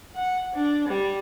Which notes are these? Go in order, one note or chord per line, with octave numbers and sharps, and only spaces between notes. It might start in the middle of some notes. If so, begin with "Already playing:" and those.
F#5
D4
G3